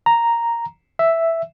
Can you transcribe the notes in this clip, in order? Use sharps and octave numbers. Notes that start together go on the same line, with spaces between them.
A#5
E5